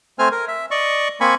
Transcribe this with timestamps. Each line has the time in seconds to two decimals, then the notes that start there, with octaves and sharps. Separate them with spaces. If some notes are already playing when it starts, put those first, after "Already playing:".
0.19 A3 C4 C5 G#5 F6
0.32 A#4
0.48 E5
0.71 D5 D#5 C#6
1.21 A#3 C4 G#5 B5 C#6